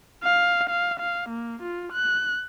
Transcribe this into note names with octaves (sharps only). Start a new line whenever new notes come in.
F5
F5
F5
A#3
F4
F#6